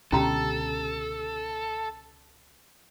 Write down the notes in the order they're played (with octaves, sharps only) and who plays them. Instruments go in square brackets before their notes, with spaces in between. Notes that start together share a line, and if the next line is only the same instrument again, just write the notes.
[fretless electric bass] C#2 B2 D3 [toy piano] C#4 G4 A#5 [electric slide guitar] A4